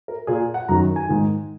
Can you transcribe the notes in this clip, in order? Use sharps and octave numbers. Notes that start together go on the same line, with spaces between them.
A#4
A#2 G#4
F#5
F#2 D#3 A#5
G#5
G#2 D#3